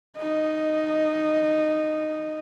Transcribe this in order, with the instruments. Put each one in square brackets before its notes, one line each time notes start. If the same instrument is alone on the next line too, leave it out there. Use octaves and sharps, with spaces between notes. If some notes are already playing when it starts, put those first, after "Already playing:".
[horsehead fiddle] D#4 D#5